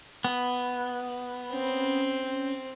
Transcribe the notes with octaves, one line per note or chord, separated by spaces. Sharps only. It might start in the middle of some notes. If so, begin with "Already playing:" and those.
B3
C4 C#4